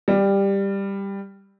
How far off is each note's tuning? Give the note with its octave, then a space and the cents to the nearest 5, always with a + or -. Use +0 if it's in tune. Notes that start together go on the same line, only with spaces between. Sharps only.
G3 +10 G4 +15